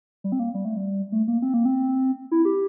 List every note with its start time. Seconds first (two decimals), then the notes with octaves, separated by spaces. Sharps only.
0.24 G3
0.32 C4
0.39 A#3
0.54 G3
0.65 A3
0.77 G3
1.12 A3
1.28 A#3
1.42 C4
1.54 A#3
1.65 C4
2.32 E4
2.45 G4